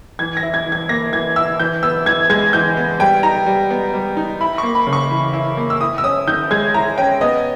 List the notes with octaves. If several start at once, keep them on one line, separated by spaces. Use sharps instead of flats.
E3 G#6
A#6
E4
G#6
E3
G#6
A#3 A#6
E3 G#6
E4 E6
E3 G6
B3 E6
E3 G#6
G#3 G#6
E3 G6
B3
G3 G5
D#4 A#5
G3
B3
G3
D#4
E4 B5
A#3 C#6
B5
C#3
C#6
E3
E4
A#3
E6
E4 D#6
E6
C#4 D#6
D#3 G6
G#3 G#6
E4 A#5
C#4 G5
B3 D#5